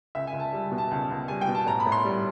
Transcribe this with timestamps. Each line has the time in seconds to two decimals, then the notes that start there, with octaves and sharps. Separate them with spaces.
0.15 C#2 E5
0.27 G#5
0.33 C#2
0.40 A5
0.53 G3
0.72 B2
0.78 A5
0.91 C#2
1.10 C#2
1.28 G3 G#5
1.41 G5
1.48 B2
1.55 A5
1.66 A2 A#5
1.80 B5
1.86 A2
1.92 C6
2.05 G3